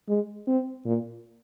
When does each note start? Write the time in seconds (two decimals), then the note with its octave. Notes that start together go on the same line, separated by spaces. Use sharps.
0.09 G#3
0.47 C4
0.85 A#2